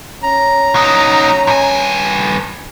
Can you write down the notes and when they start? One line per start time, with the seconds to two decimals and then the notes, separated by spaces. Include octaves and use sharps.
0.24 C#4 A#5
0.75 F#3 D#4
1.47 G2 G#5